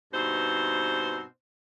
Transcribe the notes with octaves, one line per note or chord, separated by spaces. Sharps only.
G2 B2 C4 D#4 C5